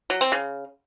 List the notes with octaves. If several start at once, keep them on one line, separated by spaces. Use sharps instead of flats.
F#3
C4
C#3